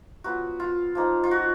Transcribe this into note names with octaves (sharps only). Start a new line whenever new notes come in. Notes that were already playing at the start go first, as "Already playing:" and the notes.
F#3 B3 F4 F#4
F4
F3 A#3 D#4
F4
F#4